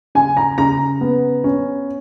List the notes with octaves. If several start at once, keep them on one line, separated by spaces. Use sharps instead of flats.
C#3 G#5
A#5
C#3 A#5
B3
C#4